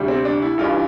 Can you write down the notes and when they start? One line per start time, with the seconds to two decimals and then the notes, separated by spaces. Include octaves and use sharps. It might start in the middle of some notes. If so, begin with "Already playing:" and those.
Already playing: D2 C3 G3
0.08 C4
0.25 D4
0.42 E4
0.58 A1 G2 E3 F4